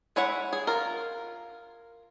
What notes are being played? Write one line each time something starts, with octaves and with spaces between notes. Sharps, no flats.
G#3 E4 C#5 E5 F#5
G#4
F4 A#4